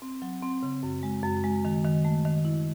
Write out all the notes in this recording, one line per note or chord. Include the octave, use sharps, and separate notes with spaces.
C4
F#3
C4
C#3
F#2
G#3
F#2
G#3
D#3
D#3
A3
D#3
E4